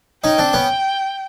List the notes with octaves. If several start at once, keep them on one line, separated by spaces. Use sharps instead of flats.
C#4 D#4 G5
C4 D4
B3 C#4